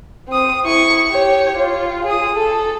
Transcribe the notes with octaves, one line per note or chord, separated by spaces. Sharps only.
C4 D#6
E4 C#6
G4 C#5
F4
G#4 D#6
A4